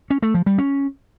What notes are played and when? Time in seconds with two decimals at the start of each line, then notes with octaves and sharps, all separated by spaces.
0.10 C#4
0.22 A3
0.34 F3
0.46 G3
0.58 C#4